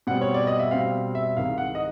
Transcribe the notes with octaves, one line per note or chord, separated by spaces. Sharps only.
B2 G3 C4 F#5
C#5
D5
D#5
E5
B2 G3 C4 F5
E5
C2 C3 D#3 G#3 F5
F#5
D#5